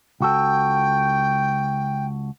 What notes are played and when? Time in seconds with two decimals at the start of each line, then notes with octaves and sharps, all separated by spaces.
0.21 C#2 F#4 A4 G5